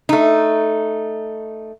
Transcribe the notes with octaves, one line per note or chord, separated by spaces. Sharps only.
A3 D#4